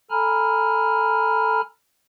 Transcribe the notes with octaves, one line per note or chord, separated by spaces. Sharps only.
A4 G#5 A#5 B5 F6